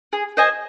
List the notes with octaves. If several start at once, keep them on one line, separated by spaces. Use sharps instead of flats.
G#4
C5 D#5 G#5